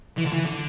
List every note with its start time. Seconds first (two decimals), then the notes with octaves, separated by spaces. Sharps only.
0.17 E3
0.25 D3
0.32 E3
0.45 D3